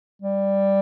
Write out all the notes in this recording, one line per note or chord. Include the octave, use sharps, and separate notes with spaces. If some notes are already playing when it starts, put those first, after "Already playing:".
G3